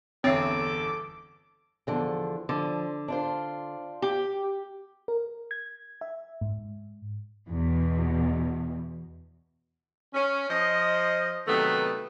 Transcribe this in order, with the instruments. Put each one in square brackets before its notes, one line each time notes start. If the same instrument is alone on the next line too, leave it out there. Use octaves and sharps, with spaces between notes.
[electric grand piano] G1 E2 [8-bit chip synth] C4 [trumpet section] A4 D6 [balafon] C#5 E5
[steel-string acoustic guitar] E2 D3 F3
[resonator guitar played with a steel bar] D3 [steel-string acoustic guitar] F3
[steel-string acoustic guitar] D4 F4 C5
[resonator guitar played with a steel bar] G4
[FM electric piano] A#4
G#6
E5
G#2
[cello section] E2 B2
[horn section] C#4
F3 C5 D#5
C3 D#3 F#3 A3 B3